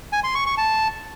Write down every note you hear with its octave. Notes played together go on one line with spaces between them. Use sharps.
G#5
C6
C#6
C#6
A5